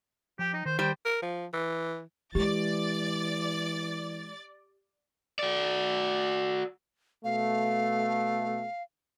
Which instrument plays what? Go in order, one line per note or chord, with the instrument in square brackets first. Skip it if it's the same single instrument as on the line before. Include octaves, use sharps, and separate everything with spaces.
[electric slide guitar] F3 G5 [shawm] G4
[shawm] D#4
[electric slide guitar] D#3 [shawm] C5
[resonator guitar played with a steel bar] G3 C5 [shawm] G5
[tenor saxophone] A#4
F3
E3
[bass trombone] E3 [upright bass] G#3 [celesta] G4 [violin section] D5 A6
[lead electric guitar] F#4 D5
[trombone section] B2 A3 [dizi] F5